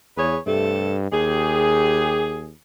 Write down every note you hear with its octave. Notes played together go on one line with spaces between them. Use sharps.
E2 G#4 B4 C#5
G2 C3 A3 A4
D#2 G4 G#4